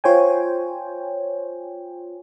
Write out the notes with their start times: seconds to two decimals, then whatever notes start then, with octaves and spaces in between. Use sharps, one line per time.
0.04 F4 C5 C#5 G5 G#5